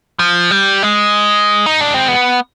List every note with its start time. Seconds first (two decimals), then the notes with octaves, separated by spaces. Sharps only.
0.19 F3
0.51 G3
0.83 G#3
1.66 D#4
1.81 D4
1.94 C4
2.08 B3